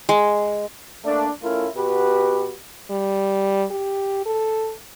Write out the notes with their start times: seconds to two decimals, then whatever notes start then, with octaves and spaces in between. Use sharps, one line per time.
0.09 G#3
1.04 A3 A#3 D4
1.41 A3 C#4 E4 F4 A#4
1.75 B2 F#4 G4 B4
2.90 G3
3.71 G4
4.26 A4